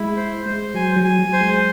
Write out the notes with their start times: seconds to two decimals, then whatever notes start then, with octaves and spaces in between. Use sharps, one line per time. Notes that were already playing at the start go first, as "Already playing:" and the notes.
Already playing: G#3 E4
0.17 C5
0.46 G#3 C5
0.74 F#3 G#5
0.96 F#3
1.04 G#5
1.19 F#3
1.33 C5
1.41 G#3